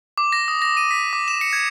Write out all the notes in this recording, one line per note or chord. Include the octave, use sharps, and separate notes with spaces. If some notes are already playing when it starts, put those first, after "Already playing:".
D6
A#6
D#6
A#6
D#7
B6
D6
E7
C#7
G#6